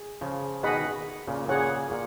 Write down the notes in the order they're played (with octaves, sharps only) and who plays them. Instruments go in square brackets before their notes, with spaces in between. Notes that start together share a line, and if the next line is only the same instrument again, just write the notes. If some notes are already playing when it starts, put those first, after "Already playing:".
Already playing: [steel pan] G#4
[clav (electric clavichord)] C#3 F3
[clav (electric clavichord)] B2 D#3 [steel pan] G#4 D#5 F#5 B5
[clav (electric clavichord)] A#2 C#3
[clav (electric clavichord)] A#2 C#3 [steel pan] G#4 C#5 F#5
[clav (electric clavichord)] A#2